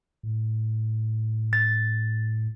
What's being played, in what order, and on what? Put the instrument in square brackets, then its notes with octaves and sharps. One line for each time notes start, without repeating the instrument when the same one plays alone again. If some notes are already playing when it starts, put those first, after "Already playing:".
[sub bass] A2
[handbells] A6